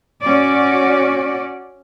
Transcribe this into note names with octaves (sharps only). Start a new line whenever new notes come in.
C#4 F#4 D5